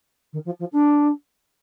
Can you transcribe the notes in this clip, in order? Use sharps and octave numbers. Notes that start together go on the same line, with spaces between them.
D#3
F3
F3
D4